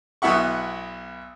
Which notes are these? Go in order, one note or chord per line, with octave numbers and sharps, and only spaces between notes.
B1 B3 E4 E5 F#5 C#6